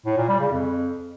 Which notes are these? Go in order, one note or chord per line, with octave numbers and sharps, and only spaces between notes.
A2
A#2
G3
C#3
F2